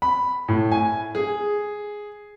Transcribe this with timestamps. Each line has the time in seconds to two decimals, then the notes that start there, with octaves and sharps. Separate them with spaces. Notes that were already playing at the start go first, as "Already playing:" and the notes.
0.02 B5
0.48 A2
0.72 G#5
1.15 G#4